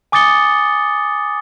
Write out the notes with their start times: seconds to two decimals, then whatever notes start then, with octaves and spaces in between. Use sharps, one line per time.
0.12 G#5 D6 D#6 A6 C#7 G7